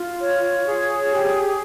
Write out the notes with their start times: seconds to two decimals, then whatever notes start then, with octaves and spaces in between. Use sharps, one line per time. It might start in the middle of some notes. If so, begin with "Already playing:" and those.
Already playing: F4
0.21 C#5
0.65 G#4
1.11 G4